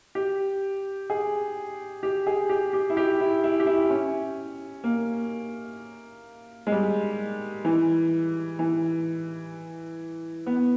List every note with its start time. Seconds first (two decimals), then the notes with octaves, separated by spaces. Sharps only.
0.15 G4
1.10 G#4
2.03 G4
2.27 G#4
2.49 G4
2.73 G4
2.90 E4
2.97 G4
3.20 E4
3.44 E4
3.60 G4
3.67 E4
3.90 C#4
4.84 A#3
6.67 G#3
6.72 G3
7.65 E3
8.59 E3
10.47 B3